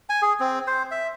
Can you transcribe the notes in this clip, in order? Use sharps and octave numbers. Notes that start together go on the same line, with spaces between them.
G#5
G#4
C4
C5
E5